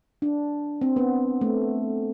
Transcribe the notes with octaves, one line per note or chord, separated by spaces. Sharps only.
D4
C4
B3
A3